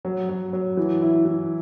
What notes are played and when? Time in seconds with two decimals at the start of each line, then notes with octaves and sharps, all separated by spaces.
0.05 F#3
0.29 F#3
0.53 F#3
0.77 E3
1.02 E4
1.25 E3